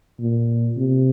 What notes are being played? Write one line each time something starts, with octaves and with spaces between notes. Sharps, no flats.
A#2
C3